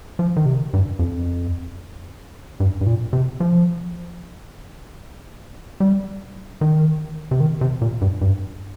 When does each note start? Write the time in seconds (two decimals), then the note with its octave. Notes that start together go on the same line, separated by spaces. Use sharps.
0.19 F3
0.36 D#3
0.46 C3
0.73 G2
0.99 F2
2.60 G2
2.81 G2
2.87 A#2
3.13 C3
3.40 F3
5.80 G3
6.61 D#3
7.31 C3
7.40 D#3
7.61 C3
7.81 A#2
8.01 G2
8.21 G2